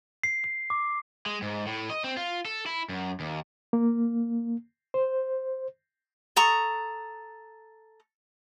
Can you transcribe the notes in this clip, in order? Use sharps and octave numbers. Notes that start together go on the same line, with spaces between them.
C7
C7
D6
G#3
G#2
A2
D#5
C4
F4
A4
E4
F#2
D#2
A#3
C5
A4 A#5 C#6 D#6